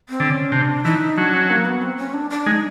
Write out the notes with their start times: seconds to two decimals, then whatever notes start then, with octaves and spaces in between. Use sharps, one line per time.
0.09 C4
0.20 D3
0.30 C#4
0.52 C3 D4
0.85 E3 D#4
1.17 F#3 D4
1.33 C#4
1.50 A#3
1.65 B3
1.82 C4
1.98 C#4
2.14 D4
2.30 D4
2.46 G#3 D#4